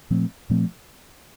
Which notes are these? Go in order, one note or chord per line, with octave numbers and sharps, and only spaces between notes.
A#2 F3 A3 C4
A#2 F3 A3 C4